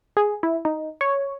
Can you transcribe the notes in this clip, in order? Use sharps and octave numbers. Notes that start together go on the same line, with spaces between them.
G#4
E4
D#4
C#5